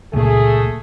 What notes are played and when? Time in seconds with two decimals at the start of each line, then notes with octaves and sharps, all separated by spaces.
0.13 C#2 A#2 A3 G#4